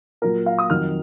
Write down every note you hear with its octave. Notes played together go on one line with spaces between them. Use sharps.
A#2 F#3 A#4
F5
D#6
F2 D#3 F#3 F6